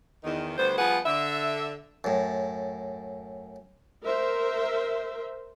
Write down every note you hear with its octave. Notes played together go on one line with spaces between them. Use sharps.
E2 D#3
D2 G3 B3 C5
F3 G3 B3 G#4 B4 F#5
D3 E5
F#2 A2
A#4 C5 E5